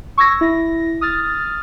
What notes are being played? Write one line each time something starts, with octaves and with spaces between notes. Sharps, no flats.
C#6 E6 G#6 A#6
E4 A#6
D#6 F6 A6